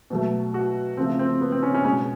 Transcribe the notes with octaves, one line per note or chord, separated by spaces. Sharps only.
B2 F#3 A3
F#4
C#3 F3 A3 C4
C4
B3
C4
C#4
C#4
B2 G#3 C#4